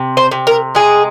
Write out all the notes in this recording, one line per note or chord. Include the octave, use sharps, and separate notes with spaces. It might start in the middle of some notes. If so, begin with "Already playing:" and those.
Already playing: C3
C5
C3
A#4
G#3 G#4